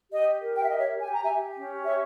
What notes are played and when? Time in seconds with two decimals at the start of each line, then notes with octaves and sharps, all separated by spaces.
0.11 G4 D#5
0.41 A#4
0.55 G5
0.62 E5
0.69 G4 D#5
0.78 C#5 E5
0.98 G4 G#5
1.12 A#5
1.24 E5 G#5
1.27 G4
1.57 C#4
1.85 G4 C#5 E5